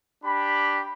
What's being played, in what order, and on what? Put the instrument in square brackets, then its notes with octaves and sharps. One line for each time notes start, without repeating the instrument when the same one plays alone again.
[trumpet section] D4 G4 B5